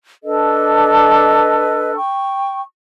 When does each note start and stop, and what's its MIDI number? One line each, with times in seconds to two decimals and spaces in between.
0.24 1.95 62
0.24 1.95 69
0.24 1.95 71
0.24 1.95 75
1.95 2.61 79
1.95 2.61 85